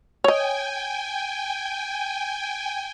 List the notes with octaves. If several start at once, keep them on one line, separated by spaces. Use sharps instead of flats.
C#5 D#5 G5 G#5